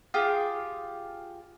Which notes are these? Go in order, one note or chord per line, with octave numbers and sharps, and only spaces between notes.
F4 G4 G#4